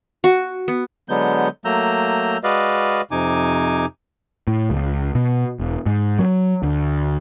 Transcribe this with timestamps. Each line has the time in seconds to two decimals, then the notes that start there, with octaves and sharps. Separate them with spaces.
0.24 F#4
0.68 B3
1.09 D3 F#3 G#3 B3 G6
1.65 F#3 A3 A#3 A#5 E6 G6
2.44 G#3 F#4 B4 D5 D#5 F5
3.11 F2 C3 D#4 G#5 D6
4.47 A2
4.70 C#2
5.15 B2
5.60 E1
5.86 G#2
6.19 F#3
6.63 D2